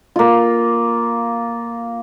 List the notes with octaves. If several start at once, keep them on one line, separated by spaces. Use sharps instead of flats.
A#3 F4